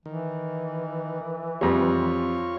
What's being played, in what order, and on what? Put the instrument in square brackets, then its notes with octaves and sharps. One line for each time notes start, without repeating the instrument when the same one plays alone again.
[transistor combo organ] D#3 [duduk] E3
[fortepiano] F2 G3 [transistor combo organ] F4 C#5